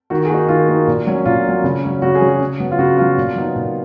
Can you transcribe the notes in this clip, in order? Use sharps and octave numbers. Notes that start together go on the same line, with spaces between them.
D#3 F#4
G#4
A#3 D#4 F#4
D#3 F4
A#3 D#4
A#2
F#3 C#4
A#2 F4
F#3 C#4
C#3
F#3 C#4
C#3 F#4
G#4
F#3 C#4
F#4
C#3
F#3 B3
F4
C#3 F#4
F#3 B3 F4
A#2
F#3 B3 D#4
A#2